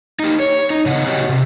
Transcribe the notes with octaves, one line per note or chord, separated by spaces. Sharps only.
D#4 G4
C#5
D#4
C#3 D#5 F#5
F#4 G4 C#5 D#5 F#5
C3